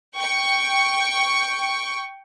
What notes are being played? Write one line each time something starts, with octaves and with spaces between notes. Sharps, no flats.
G5 C#6